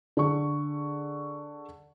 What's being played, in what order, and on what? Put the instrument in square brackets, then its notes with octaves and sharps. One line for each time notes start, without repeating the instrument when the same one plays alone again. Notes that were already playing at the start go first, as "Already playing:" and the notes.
[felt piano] D3 G#4 C#6